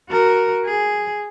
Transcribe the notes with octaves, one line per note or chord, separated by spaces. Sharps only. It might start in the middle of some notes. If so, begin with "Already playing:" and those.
F#4 A#4
G#4